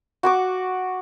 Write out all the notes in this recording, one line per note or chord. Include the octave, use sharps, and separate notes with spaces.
F#4 C#6 D6